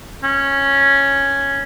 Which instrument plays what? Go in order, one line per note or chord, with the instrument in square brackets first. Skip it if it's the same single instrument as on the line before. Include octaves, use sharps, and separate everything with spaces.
[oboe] C#4